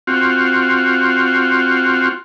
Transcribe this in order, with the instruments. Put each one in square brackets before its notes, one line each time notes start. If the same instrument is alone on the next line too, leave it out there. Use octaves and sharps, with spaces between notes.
[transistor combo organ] C4 F4 F#4